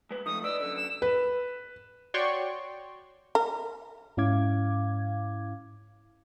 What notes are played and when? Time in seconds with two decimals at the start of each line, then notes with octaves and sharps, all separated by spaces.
0.11 G#3 B4
0.26 F3 A3 D#4 D#6
0.44 B4 D5 D#5 E6
0.60 F#2 D3 E6
0.77 E7
1.02 B4
2.14 F#4 C#5 D5 G5 C6 C#6
3.35 A#4
4.17 G#2 C#4 E4 F5 D6 G#6